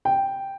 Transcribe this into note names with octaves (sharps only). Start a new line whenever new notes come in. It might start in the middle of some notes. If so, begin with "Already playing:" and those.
G5